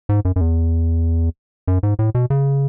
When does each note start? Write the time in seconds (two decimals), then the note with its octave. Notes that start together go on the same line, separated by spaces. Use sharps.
0.09 G#2
0.25 F#2
0.36 F#2
0.41 E2
1.68 F#2
1.83 G#2
1.99 A2
2.15 B2
2.30 C#3